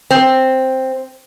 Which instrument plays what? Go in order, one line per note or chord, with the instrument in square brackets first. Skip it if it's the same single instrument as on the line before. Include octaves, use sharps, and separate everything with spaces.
[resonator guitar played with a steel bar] C4